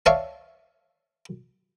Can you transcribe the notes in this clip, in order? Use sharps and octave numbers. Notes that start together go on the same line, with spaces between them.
C#5 D5 E5 F5 A5